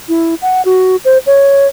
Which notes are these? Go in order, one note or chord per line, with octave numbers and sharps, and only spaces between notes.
E4
F#5
F#4
C5
C#5